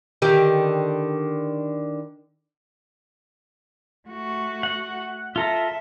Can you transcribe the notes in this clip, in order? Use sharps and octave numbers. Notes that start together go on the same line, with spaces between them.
D3 D#3 G4
A3 F#4
F#5
F4 A4 E5 A#5